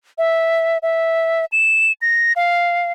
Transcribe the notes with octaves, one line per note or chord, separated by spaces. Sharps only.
E5
E5
E7
A#6
F5